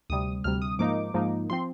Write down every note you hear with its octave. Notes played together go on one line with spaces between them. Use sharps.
D2 C3 G3 D#6
D2 C3 G3 F6
D#6
G#2 F3 A#3 D#4 D6
G#2 F3 A#3 D#4
F3 C4 C6